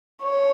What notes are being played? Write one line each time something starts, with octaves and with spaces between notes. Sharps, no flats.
C#5